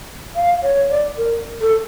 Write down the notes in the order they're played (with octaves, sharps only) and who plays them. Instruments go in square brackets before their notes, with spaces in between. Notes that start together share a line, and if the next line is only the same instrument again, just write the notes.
[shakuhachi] F5
C#5
D5
A#4
A4